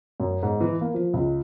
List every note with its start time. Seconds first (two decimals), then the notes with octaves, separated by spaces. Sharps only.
0.20 F#2
0.43 G#2
0.61 E3
0.81 A#3
0.94 F3
1.14 C#2